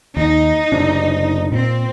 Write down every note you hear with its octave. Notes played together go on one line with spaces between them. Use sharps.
D#2 D#4
F#1 C3 D4
A#2 C4